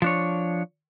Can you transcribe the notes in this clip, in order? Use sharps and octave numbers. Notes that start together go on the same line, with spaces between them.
F3 D4 C#5